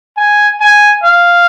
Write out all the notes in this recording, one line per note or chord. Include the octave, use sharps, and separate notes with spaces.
G#5
G#5
F5